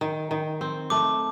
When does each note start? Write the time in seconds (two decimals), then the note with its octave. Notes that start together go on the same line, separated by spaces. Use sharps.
0.01 D#3
0.31 D#3
0.61 C4
0.90 A3 D6